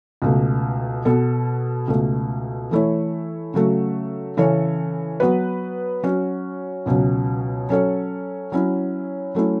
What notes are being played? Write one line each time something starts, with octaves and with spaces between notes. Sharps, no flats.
C#2 B2 A3
B2 B3 A4
C#2 B2 A3
E3 A3 E4 C#5
C#3 F#3 A3 F#4
C#3 E3 C#4 A4 C#5
F#3 B3 F#4 B4
F#3 C#4 F#4
C#2 B2 F#3 C#4
F#3 C#4 A4 C#5
F#3 C#4 E4
F#3 A3 C#4 E4